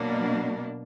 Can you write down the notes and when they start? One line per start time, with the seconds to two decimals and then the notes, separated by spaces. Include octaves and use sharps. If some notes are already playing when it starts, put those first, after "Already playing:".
Already playing: B2 F#3 A#3 D4